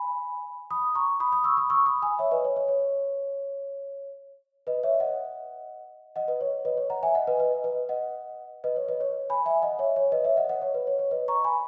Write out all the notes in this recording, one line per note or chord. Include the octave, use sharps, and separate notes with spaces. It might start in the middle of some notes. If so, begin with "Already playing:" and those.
Already playing: G#5 B5
B5 D#6
A#5 C#6
B5 D#6
B5 D#6
C#6 E6
B5 D#6
C#6 E6
B5 D#6
G#5 B5
C#5 E5
B4 D#5
C#5
C#5
C#5
B4 D#5
C#5 E5
D#5 F#5
D#5 F#5
B4 D#5
C#5
B4 D#5
C#5
F#5 A#5
E5 G#5
D#5 F#5
B4 D#5
B4 D#5
B4 D#5
D#5 F#5
B4 D#5
C#5
B4 D#5
C#5
G#5 B5
E5 G#5
D#5 F#5
C#5 E5
C#5
B4 D#5
C#5 E5
D#5 F#5
D#5 F#5
C#5
B4
C#5
C#5
B4 D#5
A#5 C#6
G#5 B5